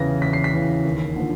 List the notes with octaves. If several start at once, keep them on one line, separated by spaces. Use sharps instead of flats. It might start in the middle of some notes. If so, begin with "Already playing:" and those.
Already playing: E2 C#3 E3 A#6
E2 B6
C7
B6
C#3 E3
D#2
D3 F3